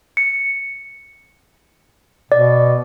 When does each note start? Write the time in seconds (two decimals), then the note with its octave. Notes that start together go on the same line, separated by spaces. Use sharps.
0.17 C#7
2.32 B2 D5